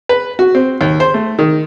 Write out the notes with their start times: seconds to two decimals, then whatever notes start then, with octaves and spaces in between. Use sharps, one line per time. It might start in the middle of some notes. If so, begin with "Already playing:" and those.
0.09 B4
0.39 F#4
0.55 C4
0.81 D#2
1.00 C5
1.14 A3
1.39 D#3